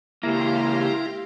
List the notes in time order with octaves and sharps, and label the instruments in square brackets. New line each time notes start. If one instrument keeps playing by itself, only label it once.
[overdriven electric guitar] C#2 A#3 [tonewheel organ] E4 A#5 [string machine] G4 F5 C6